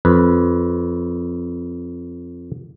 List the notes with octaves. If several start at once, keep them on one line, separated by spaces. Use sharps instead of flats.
F2 B4